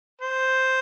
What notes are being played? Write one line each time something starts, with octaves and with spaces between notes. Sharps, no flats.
C5